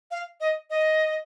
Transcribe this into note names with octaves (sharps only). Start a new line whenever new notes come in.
F5
D#5
D#5